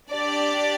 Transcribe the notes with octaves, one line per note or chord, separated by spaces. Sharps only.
D4 G4 D5